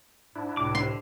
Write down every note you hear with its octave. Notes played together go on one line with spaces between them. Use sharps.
G#2 D4 E4
C#2 A2 C3 D6
D3 C6